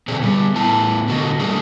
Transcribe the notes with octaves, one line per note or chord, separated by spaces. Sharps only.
B2 D3 C4 D4 G#4
G3 B3
A2 B3 E4 A5
D3 F#4 D#5
G3 A3 A#3 D4 F#4 G#4